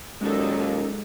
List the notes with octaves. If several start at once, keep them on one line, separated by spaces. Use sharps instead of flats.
D#2 A#2 F#3 G#3 C#4 D#4 G4 A4